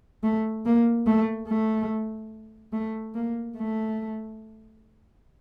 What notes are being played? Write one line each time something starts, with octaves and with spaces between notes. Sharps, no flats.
A3
A#3
A3
A3
A3
A#3
A3